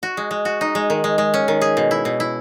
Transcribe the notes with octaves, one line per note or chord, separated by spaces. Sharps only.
F#4
G#3
G#3
F#4
D#4
G#3
D#3
G#3
G#3
C#4
D#3
G#4
B2
E4
B2
E4